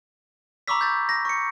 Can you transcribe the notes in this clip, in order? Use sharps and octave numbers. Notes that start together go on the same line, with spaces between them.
A#5 B5 C#6 D6 E6 B6
G6 A6
A#6
C#6 C#7